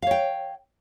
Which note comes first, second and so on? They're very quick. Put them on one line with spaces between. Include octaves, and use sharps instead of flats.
F5 C#5 G5